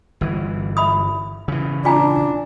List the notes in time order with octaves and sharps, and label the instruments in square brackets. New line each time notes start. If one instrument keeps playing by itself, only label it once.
[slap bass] G1 E3
[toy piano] E5 B5 D#6
[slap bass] C#3 E3
[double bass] D4 [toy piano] F4 G#5 A#5